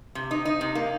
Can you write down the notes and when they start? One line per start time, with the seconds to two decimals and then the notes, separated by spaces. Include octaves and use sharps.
0.15 C3
0.31 D#4
0.45 D#4
0.61 C3
0.75 A#3